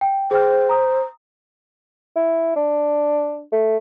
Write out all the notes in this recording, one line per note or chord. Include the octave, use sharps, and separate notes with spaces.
G5
G#4 C5 G5 F6
A#5 D#6
E4
D4
A3